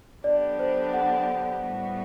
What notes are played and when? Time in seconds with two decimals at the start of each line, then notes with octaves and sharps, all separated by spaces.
0.24 D3 F#3 B3 D4 G4 D5
0.59 C5
0.93 F#5
1.63 A2 G3 B3 F#4